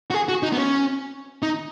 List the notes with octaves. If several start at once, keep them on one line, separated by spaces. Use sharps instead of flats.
F#4
G#4
F#4
D#4
B3
C#4
D#4